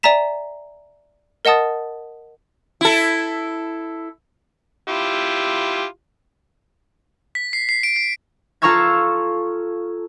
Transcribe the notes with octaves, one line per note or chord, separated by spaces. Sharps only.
D5 E5 G#5 A#5 B6 E7
A#4 D#5 F#5 A5 D#6 A6
E4 A4
E4 F4 G4
B6
C7
C7
D7
C7
F4 A4 A#5 C#6 E6 G#6